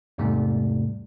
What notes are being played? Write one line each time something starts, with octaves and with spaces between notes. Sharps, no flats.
E2 G#2 C3 G3 A3